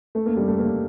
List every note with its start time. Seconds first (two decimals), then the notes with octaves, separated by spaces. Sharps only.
0.15 A3
0.26 A#3
0.37 G3
0.48 A3
0.59 A#3